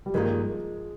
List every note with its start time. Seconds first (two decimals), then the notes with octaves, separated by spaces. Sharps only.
0.06 G3
0.14 G2 D#3 F3 G#3 A#3